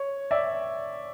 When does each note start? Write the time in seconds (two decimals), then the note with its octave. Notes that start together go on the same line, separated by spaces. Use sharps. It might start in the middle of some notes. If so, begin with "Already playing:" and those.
Already playing: C#5
0.31 D5 E5